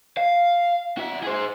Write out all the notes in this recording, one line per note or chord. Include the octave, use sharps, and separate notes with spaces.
F5
F#4 E5
G#4 C5